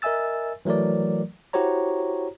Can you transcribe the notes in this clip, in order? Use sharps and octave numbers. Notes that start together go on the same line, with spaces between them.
A#4 D#5 E5 G#5 E6 A6
E3 F#3 A3 A#4 D5
E4 F#4 G4 C5 C#5 A#5